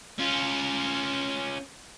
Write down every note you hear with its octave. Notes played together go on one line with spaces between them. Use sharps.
C#4 F4